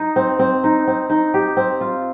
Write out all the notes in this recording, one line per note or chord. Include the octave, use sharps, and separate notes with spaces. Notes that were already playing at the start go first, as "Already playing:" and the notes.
Already playing: D#4
C4
C4
D#4
C4
D#4
G4
C4
F4